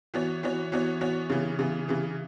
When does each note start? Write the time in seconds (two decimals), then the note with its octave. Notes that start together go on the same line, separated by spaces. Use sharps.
0.14 E3 B3 F#4 C#5
0.43 E3 B3 F#4 C#5
0.72 E3 B3 F#4 C#5
1.01 E3 B3 F#4 C#5
1.30 C#3 E3 B3
1.59 C#3 E3 B3
1.88 C#3 E3 B3